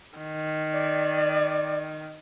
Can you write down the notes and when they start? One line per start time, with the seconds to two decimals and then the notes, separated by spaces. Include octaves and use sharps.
0.18 D#3
0.73 D5